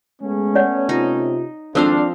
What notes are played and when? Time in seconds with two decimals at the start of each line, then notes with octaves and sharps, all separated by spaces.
0.22 G#3 A3 B3 C#4
0.55 C#5 D5 F#5
0.89 C3 D#4 F4
1.75 G#1 F3 C4 D4 A4 C5 F5 E6